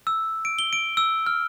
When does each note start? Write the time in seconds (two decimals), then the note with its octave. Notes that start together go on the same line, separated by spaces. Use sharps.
0.07 E6
0.45 D7
0.59 G7
0.73 D7
0.97 E6
1.26 F6